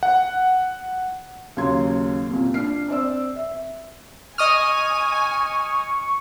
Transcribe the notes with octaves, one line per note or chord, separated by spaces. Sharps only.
F#5
D#2 C#3 F#3 C6 G#6
C2 A#2
D4 F6 C7
C4 D5 E6
E5
D#5 G#5 C#6 D#6 F6